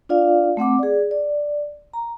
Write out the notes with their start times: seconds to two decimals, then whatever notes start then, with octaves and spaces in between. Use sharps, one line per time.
0.09 D4 F4 D5 F5
0.57 A3 C4 F#5 D6
0.79 G#4 D5
1.11 D5
1.94 A#5